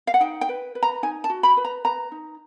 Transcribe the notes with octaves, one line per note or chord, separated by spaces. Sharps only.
F5
F#5
D#4 G5
G5
B4
B4
A#5
D#4 G#5
A5
F#4
B5
B4
A#5
B4 A#5
D#4